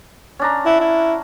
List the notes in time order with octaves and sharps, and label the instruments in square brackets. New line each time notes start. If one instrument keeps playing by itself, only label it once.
[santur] C#4 D4 A#5
[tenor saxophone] E4 [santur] F#5
[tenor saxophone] E4